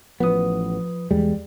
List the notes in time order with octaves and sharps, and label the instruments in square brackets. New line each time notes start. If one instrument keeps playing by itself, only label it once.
[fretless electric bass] A1 B3 [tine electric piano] F3 B4 D#6
[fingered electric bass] E2 G#3 [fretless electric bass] G3